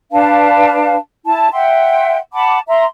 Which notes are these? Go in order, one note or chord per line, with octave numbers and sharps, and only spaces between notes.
D4 B4 F5 A5
E4 A5
E5 F#5 G5 C6
F#5 A5 B5 D6
E5 A#5 C6